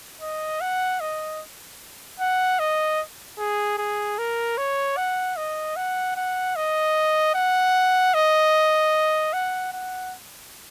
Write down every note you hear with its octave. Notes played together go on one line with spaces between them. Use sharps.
D#5
F#5
D#5
F#5
D#5
G#4
G#4
A#4
C#5
F#5
D#5
F#5
F#5
D#5
F#5
D#5
F#5
F#5